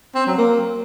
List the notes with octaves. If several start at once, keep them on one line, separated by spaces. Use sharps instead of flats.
C4
F#3
A#3